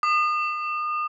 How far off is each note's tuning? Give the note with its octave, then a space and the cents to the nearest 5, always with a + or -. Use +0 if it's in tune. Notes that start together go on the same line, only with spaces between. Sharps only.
D#6 -35